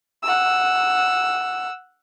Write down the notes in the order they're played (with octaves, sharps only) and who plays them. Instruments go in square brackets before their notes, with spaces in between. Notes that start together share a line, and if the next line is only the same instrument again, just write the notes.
[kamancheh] F#5 E6